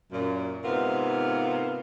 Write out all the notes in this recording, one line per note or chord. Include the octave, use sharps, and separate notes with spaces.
F#2 A#2
G#2 C3 B3 F4 A#4